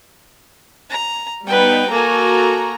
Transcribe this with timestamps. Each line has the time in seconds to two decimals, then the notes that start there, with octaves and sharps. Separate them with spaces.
0.90 A#5
1.47 G3 B3 D#4 B4 G5
1.92 A#3 F#4 A4 G#5 A#5